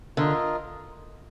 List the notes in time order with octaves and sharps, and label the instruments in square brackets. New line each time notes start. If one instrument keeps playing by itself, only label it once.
[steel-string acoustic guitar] D3 [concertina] F4 A#4 D#5